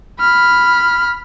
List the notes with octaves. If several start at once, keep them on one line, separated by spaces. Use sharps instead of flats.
B5 F6